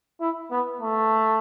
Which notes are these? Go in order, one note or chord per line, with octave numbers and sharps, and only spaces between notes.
E4
B3
A3